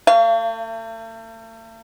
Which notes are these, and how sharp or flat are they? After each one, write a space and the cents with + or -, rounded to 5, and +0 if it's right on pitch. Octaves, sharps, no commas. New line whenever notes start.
A3 +45 F5 -35